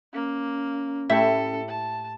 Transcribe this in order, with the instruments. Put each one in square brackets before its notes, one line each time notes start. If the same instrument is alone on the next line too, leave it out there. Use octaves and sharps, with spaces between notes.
[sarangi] A#3 [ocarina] C#4
[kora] A2 E4 G4 [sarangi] A4 [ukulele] E5
[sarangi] A5